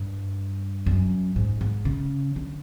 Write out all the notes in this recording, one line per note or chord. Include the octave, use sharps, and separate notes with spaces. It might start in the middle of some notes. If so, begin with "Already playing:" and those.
Already playing: G2
F#2
G#2
G#2
C#3
D3